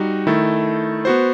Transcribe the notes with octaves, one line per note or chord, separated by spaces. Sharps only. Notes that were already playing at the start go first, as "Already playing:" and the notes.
Already playing: G3 D#4 F#4
D#3 A3 E4 A4
B3 F#4 C5